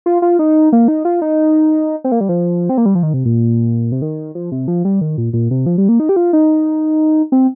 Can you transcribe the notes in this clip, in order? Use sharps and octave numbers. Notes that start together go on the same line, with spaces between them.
F4
F4
D#4
A#3
D#4
F4
D#4
C4
A#3
G3
F3
C4
A#3
G3
F3
D#3
C3
A#2
C3
D#3
F3
C3
F3
G3
D#3
A#2
A#2
C3
F3
G3
A#3
D#4
G4
F4
D#4
C4